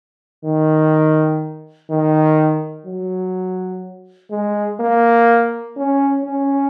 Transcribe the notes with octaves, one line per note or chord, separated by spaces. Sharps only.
D#3
D#3
F#3
G#3
A#3
C#4
C#4